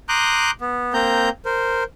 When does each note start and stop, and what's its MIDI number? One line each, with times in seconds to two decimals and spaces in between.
0.09 0.51 82
0.09 0.51 84
0.09 0.51 86
0.09 0.51 87
0.09 0.51 90
0.09 0.51 91
0.61 0.94 59
0.94 1.29 58
0.94 1.29 60
0.94 1.29 82
0.94 1.29 91
1.45 1.84 70
1.45 1.84 72